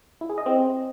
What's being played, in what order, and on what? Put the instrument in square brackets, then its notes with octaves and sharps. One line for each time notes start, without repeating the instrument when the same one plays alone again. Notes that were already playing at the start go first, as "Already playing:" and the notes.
[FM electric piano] E4
G#4
D#5
C4